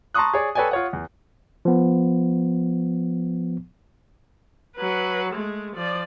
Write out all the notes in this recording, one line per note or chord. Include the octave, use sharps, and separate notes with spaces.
A5 A#5 C6 C#6 D#6 F#6
G#4 C#5 D5
A4 B4 C#5 D5 G5 G#5
F4 C#5 F#5
E2
F3 B3
F#3 B4
G#3 A3
F3 D5